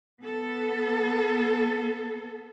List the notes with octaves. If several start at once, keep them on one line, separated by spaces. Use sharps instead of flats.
B3 A4